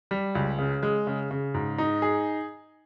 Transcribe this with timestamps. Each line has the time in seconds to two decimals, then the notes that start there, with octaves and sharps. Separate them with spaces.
0.11 G3
0.35 C#2
0.58 C#3
0.83 G#3
1.07 C#3
1.31 C#3
1.54 G#2
1.78 D#4
2.02 G#4